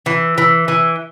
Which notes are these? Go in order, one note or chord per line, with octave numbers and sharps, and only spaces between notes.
E3
E3
E3